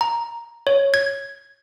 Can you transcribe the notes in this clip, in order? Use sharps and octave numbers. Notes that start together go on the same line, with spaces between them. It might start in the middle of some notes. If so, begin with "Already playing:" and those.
A#5
C#5
G#6